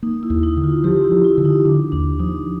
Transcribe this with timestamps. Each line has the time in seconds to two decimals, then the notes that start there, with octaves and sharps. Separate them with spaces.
0.03 A#3 D#4
0.23 E4
0.30 D#2
0.43 D#4
0.57 D3
0.64 F4
0.84 F3 G4
1.04 E4
1.12 F3
1.24 E4
1.38 D3
1.45 D#4
1.65 D3 D4
1.92 D#2 D4
2.19 F3 D#4